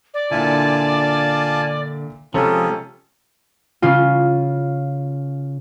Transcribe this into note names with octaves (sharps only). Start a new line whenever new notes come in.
D5
A#2 D3 E4 F4 G#5 A5
C3 F3 G#3 C#4 F4 G#4 A4 A#5
C#3 C#4 F4